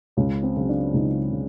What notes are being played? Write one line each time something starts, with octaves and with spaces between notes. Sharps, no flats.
C#2 C#4
C4
C#3 F#3
D4
C#2 D#4
C#3